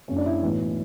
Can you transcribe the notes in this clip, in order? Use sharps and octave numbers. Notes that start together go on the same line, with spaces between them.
F#1 F#2 C#3 C#4
D4
E4
B1 A2 E3